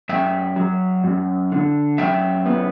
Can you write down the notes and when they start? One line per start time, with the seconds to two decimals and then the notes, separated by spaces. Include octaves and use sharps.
0.09 F#2 E5 G5
0.56 F#3
1.04 F#2
1.52 D3
1.98 F#2 E5 G5
2.46 B3